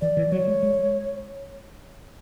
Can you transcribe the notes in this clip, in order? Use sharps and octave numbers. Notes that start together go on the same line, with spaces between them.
E3 D5
E3
F#3 C#5
G#3
G#3